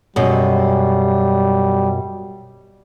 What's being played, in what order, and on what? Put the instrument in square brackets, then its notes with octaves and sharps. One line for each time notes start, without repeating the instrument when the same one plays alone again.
[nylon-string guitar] F#2 B2 G#3 [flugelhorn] G3